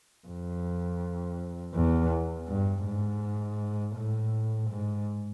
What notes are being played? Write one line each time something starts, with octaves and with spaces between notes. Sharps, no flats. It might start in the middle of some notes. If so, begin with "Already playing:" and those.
F2
E2
G2
G#2
A2
G#2